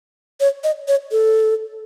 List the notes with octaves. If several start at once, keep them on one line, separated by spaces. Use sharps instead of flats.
C#5
D#5
C#5
A4